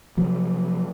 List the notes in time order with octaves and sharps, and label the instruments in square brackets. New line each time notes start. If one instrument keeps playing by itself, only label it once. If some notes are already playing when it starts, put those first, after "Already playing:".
[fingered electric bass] C3 F3 F#3